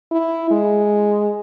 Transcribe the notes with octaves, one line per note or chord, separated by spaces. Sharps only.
E4
G#3